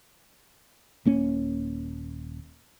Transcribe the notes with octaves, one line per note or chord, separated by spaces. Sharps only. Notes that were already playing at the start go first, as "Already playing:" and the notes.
D#1 A#3 C#4